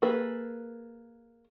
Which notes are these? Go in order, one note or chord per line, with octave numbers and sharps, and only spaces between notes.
A#3 G#4 A4 B4